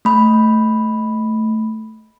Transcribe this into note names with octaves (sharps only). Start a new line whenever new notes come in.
A3 B5